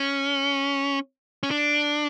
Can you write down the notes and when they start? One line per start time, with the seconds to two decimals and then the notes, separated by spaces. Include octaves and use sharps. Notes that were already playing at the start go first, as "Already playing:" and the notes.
Already playing: C#4
1.43 C#4
1.51 D4